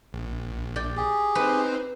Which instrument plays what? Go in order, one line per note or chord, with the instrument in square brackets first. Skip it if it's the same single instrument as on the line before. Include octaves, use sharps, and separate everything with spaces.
[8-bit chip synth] A#1
[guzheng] D5 G5
[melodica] G4 G#4
[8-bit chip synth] C4 D#4 C5 [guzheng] B4